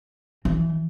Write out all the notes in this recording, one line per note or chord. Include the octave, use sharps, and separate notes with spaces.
E3